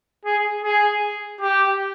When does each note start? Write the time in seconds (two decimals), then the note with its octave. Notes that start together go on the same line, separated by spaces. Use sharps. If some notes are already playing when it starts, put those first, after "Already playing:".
0.25 G#4
0.63 G#4
1.41 G4